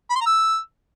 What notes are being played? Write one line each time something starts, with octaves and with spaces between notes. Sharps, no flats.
B5
C6
A#5
E6